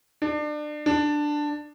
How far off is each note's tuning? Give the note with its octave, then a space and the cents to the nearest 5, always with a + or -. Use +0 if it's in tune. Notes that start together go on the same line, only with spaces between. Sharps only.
D4 +30
D4 +10